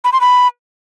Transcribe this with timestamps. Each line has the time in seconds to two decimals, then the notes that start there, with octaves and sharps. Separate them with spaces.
0.04 B5
0.13 C6
0.21 B5